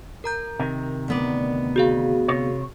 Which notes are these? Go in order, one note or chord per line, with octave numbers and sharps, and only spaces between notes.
A#4 A#5 G6
C3 D#3
D2 B3 D5
F#4 G#4 F5
C3 C#5